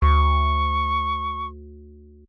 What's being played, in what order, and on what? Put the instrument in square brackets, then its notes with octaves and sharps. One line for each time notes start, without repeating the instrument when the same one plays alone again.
[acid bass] D2 [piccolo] C#6